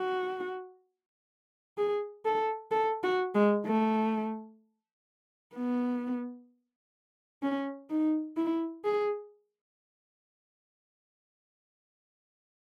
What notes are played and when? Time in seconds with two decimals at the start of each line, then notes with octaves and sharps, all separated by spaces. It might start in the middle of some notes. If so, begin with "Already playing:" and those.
Already playing: F#4
1.78 G#4
2.26 A4
2.71 A4
3.04 F#4
3.35 G#3
3.66 A3
5.55 B3
7.43 C#4
7.90 D#4
8.37 E4
8.85 G#4